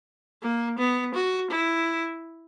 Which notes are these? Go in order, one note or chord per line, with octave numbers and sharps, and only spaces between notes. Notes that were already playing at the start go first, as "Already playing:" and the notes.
A#3
B3
F#4
E4